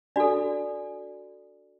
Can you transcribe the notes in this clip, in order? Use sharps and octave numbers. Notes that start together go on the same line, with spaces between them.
D4 F#4 A4 D5